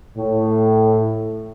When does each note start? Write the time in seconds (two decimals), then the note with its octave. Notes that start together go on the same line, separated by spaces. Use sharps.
0.17 A2